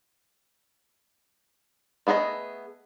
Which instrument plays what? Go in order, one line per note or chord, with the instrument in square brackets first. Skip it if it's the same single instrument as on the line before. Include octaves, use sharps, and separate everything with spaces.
[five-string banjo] A3 B3 G#4 B4 D#5